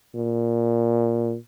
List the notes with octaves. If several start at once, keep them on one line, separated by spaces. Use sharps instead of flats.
A#2